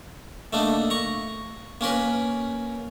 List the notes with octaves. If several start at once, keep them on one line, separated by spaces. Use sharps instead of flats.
A3 A#3 D4 D#4
A#5 C#6
A#3 C#4 A#4 B4